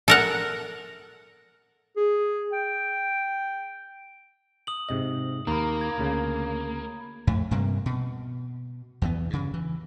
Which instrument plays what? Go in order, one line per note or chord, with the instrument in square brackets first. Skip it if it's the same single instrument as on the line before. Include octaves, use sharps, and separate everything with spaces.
[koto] A4 A#4 F#5
[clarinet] G#4
G5
[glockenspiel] D#6 F#7
[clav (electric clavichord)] G#2 C3 D#5
[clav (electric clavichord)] D#2 [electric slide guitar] A#3 [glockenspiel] A#5 B5
[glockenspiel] G#6
[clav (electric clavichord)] D2 C#3
[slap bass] F2 A2 A3
G2 C3 G3 A#3
B2
E2 E3 B3
G2 C#3
E3